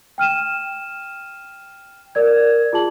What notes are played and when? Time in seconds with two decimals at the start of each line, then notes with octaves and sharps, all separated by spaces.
0.18 G5 F6 D#7 E7
2.15 A#4 D5 G#6
2.73 F4 G#4 A5 F#7